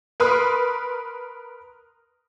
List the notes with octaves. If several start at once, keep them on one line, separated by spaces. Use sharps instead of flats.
A#4 B4 C6 D#6